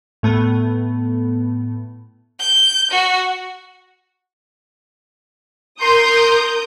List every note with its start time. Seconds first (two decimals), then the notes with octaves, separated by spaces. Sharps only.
0.23 A2 A3 B3
2.40 G6
2.91 F#4
5.80 A#4 C6 D#6 G6